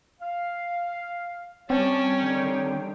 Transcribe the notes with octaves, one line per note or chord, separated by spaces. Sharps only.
F5
G3 C4 C#4 C#5 G5 A5
D3 D#3 G3